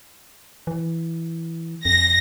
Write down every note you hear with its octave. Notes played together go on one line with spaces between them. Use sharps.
E3
F2 A#6